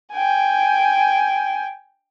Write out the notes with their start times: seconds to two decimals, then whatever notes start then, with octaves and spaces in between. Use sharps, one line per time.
0.13 G5 G#5